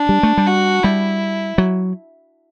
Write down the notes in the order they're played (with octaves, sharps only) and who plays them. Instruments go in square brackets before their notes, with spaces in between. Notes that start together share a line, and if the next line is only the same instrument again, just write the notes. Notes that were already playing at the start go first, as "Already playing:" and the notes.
Already playing: [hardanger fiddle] D4
[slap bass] G3
A3
G3
[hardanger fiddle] F#4
[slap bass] G3 [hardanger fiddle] E4
[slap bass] F#3